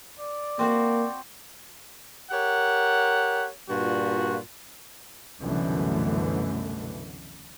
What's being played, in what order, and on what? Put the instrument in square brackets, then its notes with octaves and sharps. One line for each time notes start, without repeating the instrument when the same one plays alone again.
[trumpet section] D5
[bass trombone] A#3 [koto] C4 F#4 C5
[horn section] G4 A#4 C#5 F#5
G2 A#2 F4 F#4
[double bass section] C2 F#2 B2 D3 E3 A3